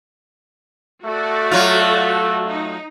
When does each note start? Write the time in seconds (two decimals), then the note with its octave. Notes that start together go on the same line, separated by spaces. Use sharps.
1.05 A3 F#4 A4 D5
1.51 F#3 F4
2.48 D#4